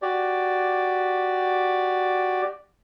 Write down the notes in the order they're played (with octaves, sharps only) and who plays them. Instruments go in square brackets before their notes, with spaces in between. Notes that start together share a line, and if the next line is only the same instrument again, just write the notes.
[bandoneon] F#4 G4 D5